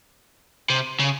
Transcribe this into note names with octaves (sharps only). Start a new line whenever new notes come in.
C3
C#3